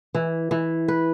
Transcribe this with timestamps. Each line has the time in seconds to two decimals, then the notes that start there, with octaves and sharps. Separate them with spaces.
0.14 E3
0.51 E3
0.88 B4